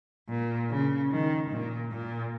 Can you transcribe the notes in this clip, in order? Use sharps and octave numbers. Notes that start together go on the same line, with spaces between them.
A#2
C#3
D#3
A#2
A#2